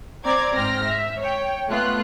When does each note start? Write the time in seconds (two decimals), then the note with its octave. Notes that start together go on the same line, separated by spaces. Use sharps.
0.25 C4 D5 A#5 D6 G#6
0.55 G#2 C4 G5 F6 A#6
0.85 E5
1.20 C#5 G5
1.70 A3 B3 F4 F#6